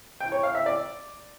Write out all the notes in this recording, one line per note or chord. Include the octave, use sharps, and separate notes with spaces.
G5
C#5
F5
E5
D5